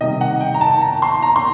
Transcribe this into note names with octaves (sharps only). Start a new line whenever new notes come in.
C3 D#3 G3 D#5
F#5
G5
A#5
A5
A#5
C6
A#5
C6